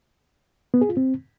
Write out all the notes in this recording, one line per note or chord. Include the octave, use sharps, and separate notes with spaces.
B3
G#4
F4
C4